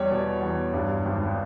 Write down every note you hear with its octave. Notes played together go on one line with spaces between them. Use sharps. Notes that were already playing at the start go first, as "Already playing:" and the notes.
Already playing: E2 G3 C#5
B2
E2
G2
G#1